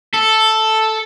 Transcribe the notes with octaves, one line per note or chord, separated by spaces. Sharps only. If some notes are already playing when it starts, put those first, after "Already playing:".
A4